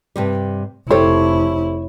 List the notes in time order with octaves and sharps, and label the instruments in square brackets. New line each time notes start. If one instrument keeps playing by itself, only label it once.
[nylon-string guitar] G2 C3 G3
[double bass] F1 E4 [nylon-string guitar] G4 A4 C5 [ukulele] C#5